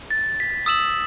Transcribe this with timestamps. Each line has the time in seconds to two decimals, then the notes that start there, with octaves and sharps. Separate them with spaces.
0.11 A6
0.40 B6
0.66 D#6 E6 E7 F#7